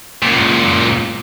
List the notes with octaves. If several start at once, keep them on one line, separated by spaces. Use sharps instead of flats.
C#2 A#2